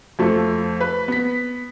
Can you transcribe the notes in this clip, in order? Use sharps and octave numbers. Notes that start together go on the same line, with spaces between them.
F2 F3 A3
B4
B3 B6